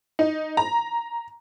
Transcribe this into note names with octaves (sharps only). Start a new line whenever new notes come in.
D#4
A#5